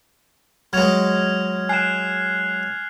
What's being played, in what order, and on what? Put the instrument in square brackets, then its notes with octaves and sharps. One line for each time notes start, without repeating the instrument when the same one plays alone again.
[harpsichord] F#3 G#3 [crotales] F6 G#6 F7
[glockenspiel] G#5 E7 [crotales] F#6 G#6 C7